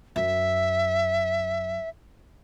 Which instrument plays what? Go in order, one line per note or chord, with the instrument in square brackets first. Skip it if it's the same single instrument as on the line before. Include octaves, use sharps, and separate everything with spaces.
[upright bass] F#2 [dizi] E5